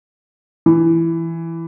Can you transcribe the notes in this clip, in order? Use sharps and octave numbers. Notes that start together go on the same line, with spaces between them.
E3